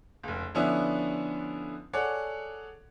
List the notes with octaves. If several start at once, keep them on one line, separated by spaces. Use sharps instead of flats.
F1 C#2
D3 F3 B3 C#4 D4 E4
G#4 A4 C#5 D5 F#5